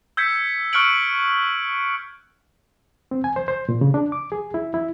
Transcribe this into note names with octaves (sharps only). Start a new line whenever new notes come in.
E6 G6 G#6 B6 C#7
C#6 F6 F#6 C#7 D7 F#7
C4
G#5
C5
C5
A#2
C#3
D4
D6
G#4
E4
E4